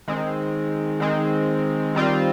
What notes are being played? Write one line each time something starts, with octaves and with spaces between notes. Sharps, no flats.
D#3 G#3 C4
D#3 G#3 C4
D#3 G3 C4 F4